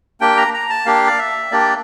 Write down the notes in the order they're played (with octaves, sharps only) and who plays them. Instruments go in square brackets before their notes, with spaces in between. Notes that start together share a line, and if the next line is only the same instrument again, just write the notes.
[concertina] A#3 D4 G4 G5
A#5
A#5
A5
A#3 D4 G4 F5
D5
E5
A#3 D4 G4 D5